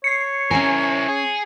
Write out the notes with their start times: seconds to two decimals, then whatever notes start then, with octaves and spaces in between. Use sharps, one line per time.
0.04 C#5 C7 C#7
0.51 C#4 E4 A#4 G#5
1.08 G#4